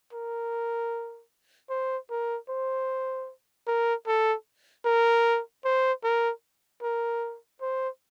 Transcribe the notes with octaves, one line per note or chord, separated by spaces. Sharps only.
A#4
C5
A#4
C5
A#4
A4
A#4
C5
A#4
A#4
C5